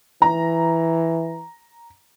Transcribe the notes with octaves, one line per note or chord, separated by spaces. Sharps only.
E3 A#5